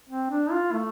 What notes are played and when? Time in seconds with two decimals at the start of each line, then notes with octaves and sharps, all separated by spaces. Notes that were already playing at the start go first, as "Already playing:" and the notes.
0.10 C4
0.30 D4
0.52 F4
0.73 A3